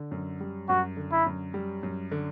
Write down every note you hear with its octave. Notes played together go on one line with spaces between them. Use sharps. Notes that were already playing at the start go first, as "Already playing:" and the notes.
Already playing: D3
F#2
G3
F#2 F#4
D3
E4
F#2
G3
F#2
D3